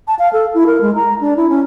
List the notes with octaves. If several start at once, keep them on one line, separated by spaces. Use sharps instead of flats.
A5
F5
A4
E4
A#4
G#3
A#5
D4
E4
C#4